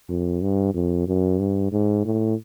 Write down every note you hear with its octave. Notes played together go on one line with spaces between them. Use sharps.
F2
G2
F2
F#2
G2
G#2
A2